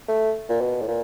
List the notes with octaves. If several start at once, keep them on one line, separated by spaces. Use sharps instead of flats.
A3
A#2
B2
A2
A#2